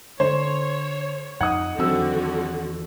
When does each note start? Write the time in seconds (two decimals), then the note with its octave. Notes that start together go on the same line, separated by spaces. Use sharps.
0.20 D3 C5 C#5
1.41 F2 D#4 F#5 D#6 G#6
1.78 E2 D3 D#3 F3 F#3 C4 F#4 E6